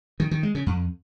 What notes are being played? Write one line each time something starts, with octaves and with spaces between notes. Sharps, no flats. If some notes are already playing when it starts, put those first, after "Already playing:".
D#3
D#3
G#3
C#3
F2